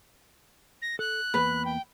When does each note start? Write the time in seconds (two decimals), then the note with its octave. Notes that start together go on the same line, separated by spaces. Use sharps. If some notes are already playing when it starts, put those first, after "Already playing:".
0.82 A#6
0.99 A4 F#6
1.34 E2 A#3 B4 B5
1.65 G5